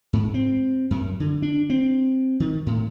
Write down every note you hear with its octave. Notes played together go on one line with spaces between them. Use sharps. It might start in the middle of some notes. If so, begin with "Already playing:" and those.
G#2
C4
F#2
D3
D4
C4
D#3
A2